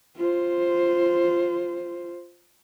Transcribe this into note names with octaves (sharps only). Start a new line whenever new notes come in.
F4 C5